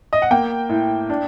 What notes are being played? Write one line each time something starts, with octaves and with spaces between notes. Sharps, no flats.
D#5
F#5
A#3 G5
A2
D4